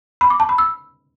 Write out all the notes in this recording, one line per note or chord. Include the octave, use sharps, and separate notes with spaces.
B5
D6
A5
B5
E6